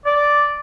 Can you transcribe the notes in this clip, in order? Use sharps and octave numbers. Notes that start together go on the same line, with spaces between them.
D5